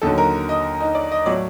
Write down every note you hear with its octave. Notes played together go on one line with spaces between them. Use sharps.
D#2 D3 F#3 A4
A#4
D#5
D#4
D5
D#5
A2 F#3 D5